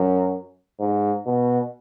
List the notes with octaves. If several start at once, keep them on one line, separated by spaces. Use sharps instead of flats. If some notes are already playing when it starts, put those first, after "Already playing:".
Already playing: F#2
G#2
B2